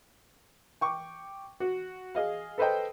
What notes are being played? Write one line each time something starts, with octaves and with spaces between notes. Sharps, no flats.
G5 C#6 D6
F#4
G#4 D#5 F5
A4 B4 C5 D#5 G5